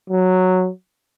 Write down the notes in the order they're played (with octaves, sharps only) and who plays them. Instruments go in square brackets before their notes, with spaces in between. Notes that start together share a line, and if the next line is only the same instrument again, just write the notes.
[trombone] F#3